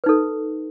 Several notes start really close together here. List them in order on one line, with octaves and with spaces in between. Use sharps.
B4 D#4 A4